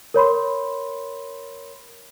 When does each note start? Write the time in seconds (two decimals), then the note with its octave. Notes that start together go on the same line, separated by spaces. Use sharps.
0.14 A#4 C#5 B5 C6